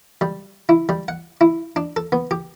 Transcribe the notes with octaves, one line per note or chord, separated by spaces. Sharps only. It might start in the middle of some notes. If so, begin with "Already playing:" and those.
G3
E4
G3
F#5
E4
D4
A4
B3
G4